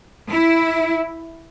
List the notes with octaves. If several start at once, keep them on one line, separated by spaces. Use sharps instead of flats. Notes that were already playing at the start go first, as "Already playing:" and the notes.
E4